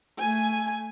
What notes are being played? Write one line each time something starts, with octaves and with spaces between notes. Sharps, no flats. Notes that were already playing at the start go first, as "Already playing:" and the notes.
A3 G#5